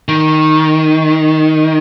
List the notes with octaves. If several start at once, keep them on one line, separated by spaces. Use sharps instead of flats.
D#3